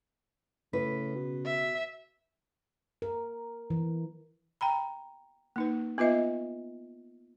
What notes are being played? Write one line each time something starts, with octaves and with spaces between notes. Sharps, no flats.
A2 C#3 B4
B2
E5
A#4
E3
G5 A#5 B5
A#3 D#4 B4
B3 F4 B4 D#5 E5